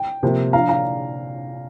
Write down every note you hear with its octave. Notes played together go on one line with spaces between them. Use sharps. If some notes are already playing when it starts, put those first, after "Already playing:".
Already playing: G5
C3 F3 A#3
F3 D4 F5 A#5
F5 A#5